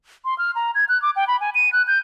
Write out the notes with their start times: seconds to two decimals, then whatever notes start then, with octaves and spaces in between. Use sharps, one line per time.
0.25 C6
0.38 F6
0.55 A#5
0.75 G#6
0.89 F#6
1.02 D6
1.16 G5
1.27 B5
1.40 G#5
1.55 D#7
1.72 F#6
1.87 G6